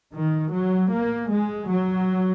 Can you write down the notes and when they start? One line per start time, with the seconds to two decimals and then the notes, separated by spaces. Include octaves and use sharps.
0.14 D#3
0.53 F#3
0.92 A#3
1.30 G#3
1.68 F#3